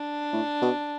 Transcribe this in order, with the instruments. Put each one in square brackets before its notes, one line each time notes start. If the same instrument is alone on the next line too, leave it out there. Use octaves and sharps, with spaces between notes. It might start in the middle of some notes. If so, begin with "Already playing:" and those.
Already playing: [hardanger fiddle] D4
[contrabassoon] A2
B2